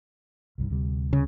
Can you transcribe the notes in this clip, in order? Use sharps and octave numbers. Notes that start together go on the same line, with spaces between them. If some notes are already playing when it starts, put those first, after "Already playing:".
C2 G2 D#3
D2 C3 G3
C#3